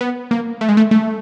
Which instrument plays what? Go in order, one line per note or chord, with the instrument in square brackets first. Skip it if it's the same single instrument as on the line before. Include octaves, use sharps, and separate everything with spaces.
[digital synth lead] B3
A#3
A3
G#3
A3
A3